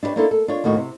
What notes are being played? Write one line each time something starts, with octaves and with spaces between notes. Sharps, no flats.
D4 E4 G4 B4 C#5
A#3 C#4 D4 E4 A4 C5
A4
D4 F4 C#5
D#2 A2 D#3 F#4
C3